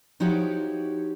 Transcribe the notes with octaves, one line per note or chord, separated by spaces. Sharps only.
F3 D#4 E4 F#4 G4 C#5